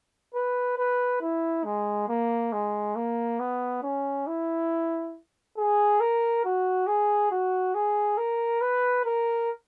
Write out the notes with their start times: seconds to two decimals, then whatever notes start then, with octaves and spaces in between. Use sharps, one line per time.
0.34 B4
0.78 B4
1.21 E4
1.65 G#3
2.09 A#3
2.53 G#3
2.96 A#3
3.39 B3
3.83 C#4
4.27 E4
5.57 G#4
6.00 A#4
6.45 F#4
6.87 G#4
7.31 F#4
7.75 G#4
8.18 A#4
8.61 B4
9.05 A#4